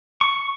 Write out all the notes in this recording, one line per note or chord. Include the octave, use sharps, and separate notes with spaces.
C#6